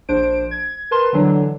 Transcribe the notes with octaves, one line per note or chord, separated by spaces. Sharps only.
A#1 D4 C5 D7
G#6
A#4 B4 A5 C6
D3 E3 F#3 D4